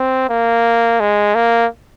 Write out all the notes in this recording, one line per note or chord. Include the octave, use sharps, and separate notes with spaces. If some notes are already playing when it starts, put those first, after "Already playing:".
Already playing: C4
A#3
G#3
A#3